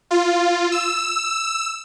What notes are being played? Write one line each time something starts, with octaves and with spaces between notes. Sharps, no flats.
F4
E6